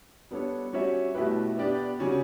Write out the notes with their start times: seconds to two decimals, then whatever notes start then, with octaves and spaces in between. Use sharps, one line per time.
0.31 G3 B3 D4 A4 C#5
0.73 G3 C#4 F#4 C#5 E5
1.15 B2 A3 E4 G4 B4
1.57 B3 D4 G4 D5
1.99 C#3 G3 C#4 F#4